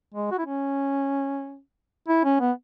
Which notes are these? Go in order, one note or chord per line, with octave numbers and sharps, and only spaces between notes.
G#3
F#4
E4
C#4
E4
C#4
B3